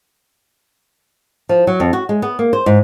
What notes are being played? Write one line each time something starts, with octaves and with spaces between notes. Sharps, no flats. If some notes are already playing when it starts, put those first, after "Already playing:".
F3
F#3
F2
F#4
G#3
B3
A#3
C5
G#2